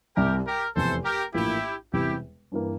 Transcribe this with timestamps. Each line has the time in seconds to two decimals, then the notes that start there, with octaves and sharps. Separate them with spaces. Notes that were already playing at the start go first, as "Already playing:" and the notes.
0.17 C2 C3 G3 G4 A#4
0.46 G4 A#4
0.75 F1 E2 C3 A4 C5
1.04 G4 A#4
1.34 A#1 A2 E3 A#3 E4 F4 G4
1.93 E1 E2 C3 E3 G3 E4 G4
2.52 G2 E3 A#3